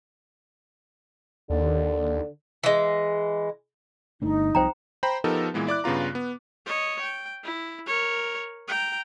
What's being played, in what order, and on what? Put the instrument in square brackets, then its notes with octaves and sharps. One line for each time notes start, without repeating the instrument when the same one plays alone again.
[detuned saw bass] D#2 [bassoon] D3
[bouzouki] E3 G#3
[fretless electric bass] G1 A3 D4 [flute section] D#4
[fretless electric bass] C2 C3 F3 [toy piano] C5 G5 A#5
[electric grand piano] C5 G5 A#5 B5
F3 B3 D#4 G4 A4 A#4
A#2 E3 G#3 B3
E4 D5 D6 F#6
G2 C#3 B3 F4 A#5
B3
[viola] C#5 D#5
G5
E4
A#4 C#5
G5 A#5